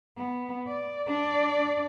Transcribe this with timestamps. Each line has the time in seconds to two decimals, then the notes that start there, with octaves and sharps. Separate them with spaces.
0.18 B3
0.67 D5
1.07 D4 D5